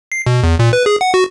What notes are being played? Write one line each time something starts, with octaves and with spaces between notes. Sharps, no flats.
C7
B2
E2
A#2
B4
G#4
F#5
F#4